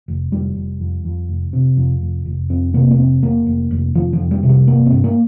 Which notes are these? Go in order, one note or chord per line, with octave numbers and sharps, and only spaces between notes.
F1
F1 G3
F1
F2
F2
F1
C3
F2
F1
F1
F2 C4
C3 A#3
A#3
F1 C4
F1 A#3
F1
F1
F1 F3
F3
F2
G3
C3
G3
G1 A#3
C4
G2
A#3